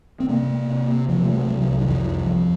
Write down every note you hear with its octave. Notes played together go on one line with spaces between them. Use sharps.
C4
C3 A#3
C3
C3 F3
A3
F#3
C2
F#3
D#3
F2 F3
F2